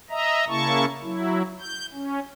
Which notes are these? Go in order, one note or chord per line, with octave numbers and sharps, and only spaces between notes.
D#5 E5 A#5
C#3 A#3 E4 A5 C#6
F#3 E4
G6
C#4